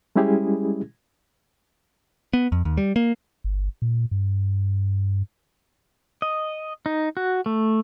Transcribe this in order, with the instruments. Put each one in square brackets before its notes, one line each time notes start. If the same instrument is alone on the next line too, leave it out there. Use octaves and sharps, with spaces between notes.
[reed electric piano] G3 G#3 C#4 E4 G4 G#4
[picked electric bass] B3
F2
D#2
G3
A#3
[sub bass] G1
A#2
G2
[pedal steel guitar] D#5
D#4
F#4
A3